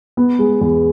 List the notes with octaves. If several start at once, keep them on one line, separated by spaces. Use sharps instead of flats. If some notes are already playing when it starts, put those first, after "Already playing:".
B3
G#3
E2